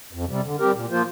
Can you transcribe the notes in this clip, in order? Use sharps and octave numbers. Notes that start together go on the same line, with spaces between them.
F2
C3 G3
D3
G3 C4 G4 A#4
A#2
F3 A#3 F4 C5